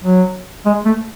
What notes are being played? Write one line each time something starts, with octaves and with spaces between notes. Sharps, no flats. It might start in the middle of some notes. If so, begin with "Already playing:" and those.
F#3
G#3
A3